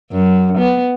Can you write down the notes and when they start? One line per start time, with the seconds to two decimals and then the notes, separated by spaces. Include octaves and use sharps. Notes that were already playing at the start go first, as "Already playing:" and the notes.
0.12 F#2
0.58 B3